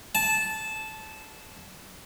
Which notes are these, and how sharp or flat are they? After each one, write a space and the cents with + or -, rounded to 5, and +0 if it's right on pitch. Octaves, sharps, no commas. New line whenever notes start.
A5 -15